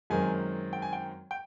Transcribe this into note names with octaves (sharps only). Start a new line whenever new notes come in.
F#2 D#3 G#3 C4 G#5
G5
G#5
G5
G5